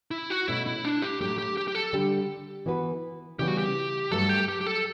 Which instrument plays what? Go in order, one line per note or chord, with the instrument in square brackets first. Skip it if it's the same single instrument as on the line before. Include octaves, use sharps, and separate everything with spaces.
[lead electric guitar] E4
F#4
[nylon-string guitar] B2 A3 C#4 [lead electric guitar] E4
[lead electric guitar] E4
D4
G4
[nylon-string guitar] A2 F#3 A3 [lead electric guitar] G4
[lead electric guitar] G4
G4
G4
A4
[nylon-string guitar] D3 G3 D4 G4
E3 B3 F#4 B4
[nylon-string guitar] C#3 E3 G3 B3 [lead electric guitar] G4
[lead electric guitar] F#4
G4
[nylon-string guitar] G2 F#3 A3 [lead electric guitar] A4
[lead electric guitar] G4
G4
G4
A4